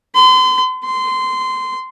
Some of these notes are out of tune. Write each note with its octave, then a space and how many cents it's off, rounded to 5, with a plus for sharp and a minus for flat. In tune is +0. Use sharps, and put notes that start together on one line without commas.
C6 -40
C6 -20